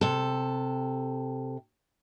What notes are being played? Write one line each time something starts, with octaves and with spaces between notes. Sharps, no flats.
C3 A4